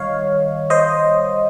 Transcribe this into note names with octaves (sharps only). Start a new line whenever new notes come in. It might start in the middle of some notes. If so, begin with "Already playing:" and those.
Already playing: D#3 G3 C#5 D#5 F5
C5 D#5